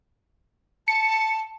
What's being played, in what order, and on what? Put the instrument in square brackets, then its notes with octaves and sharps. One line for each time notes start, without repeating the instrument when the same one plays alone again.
[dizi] A5 [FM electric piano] C#7